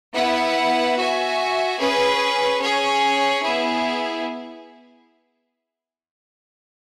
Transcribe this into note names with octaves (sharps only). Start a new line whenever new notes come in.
B3 E4 B4 F#5
F#4 E5 G#5
C#4 G#4 B4
C#4 G#4 C#5
B3 E4 G#4